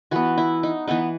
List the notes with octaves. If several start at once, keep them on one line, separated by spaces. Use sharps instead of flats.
E3 B3 F#4
E4
D#4
E3 B3 D#4